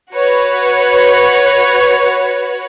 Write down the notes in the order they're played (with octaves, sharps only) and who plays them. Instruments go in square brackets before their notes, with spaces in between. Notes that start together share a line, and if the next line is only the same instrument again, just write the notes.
[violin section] F#4 B4 C#5